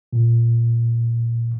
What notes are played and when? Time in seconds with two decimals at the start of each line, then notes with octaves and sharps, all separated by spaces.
0.13 A#2